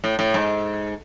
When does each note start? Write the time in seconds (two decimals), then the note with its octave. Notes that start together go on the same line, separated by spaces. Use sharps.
0.04 A2
0.19 A2
0.34 G#2